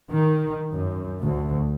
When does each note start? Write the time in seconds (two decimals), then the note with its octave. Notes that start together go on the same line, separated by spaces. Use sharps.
0.12 D#3
0.73 F#2
1.22 D2